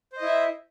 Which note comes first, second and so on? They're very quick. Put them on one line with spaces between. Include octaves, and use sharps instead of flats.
C5 D#5 E4 E5